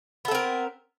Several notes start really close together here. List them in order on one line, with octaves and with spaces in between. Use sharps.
B3 A4 C4 A#4